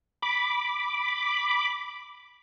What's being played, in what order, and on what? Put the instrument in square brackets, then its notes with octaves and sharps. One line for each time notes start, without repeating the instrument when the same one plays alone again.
[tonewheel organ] B5 D6